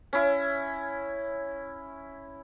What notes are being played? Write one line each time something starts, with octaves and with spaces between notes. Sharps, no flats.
C#4 E4